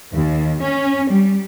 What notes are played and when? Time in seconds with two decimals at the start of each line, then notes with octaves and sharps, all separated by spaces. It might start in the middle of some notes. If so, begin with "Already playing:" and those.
0.13 D#2
0.61 C#4
1.09 G3